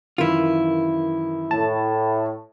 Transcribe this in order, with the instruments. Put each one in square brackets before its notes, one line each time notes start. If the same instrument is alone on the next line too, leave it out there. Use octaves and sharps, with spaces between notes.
[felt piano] F#2 D#3 E3 [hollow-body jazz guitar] E4 F4
[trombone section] A2 [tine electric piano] A5